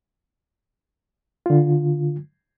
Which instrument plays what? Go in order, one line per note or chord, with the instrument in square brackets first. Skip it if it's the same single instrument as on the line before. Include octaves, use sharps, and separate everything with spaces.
[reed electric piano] D3 F4